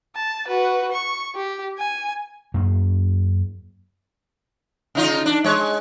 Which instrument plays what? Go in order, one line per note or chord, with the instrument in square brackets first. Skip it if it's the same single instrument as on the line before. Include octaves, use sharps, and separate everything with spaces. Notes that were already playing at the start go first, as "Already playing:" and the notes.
[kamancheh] A5
F#4 B4
C#6
G4
G#5
[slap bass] F#2 A#3
[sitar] C#3 D#4 F4
D4
G#3 C#5